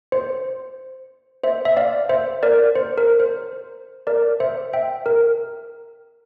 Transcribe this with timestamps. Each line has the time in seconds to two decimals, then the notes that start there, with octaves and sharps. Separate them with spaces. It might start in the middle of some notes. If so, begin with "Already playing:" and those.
0.12 C5
1.44 C5 E5
1.65 E5
1.77 D5 F5
2.09 C5 E5
2.43 A#4 D5
2.75 C5
2.98 A#4
3.20 C5
4.07 A#4 D5
4.40 C5 E5
4.73 E5 G5
5.06 A#4